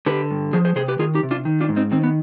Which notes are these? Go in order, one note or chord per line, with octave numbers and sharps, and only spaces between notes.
D3 G4 B4
G2
F3 G#4 C5
G#4 C5
C3 G#4 C5
G4 B4
D#3 F4 G#4
D#4 G4
C3
D4 F4
D#3
D4 F4
G#2
C4 D#4
D#3 C4
B3